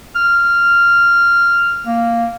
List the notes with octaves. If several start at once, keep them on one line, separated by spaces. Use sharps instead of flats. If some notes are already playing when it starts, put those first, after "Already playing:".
F6
A#3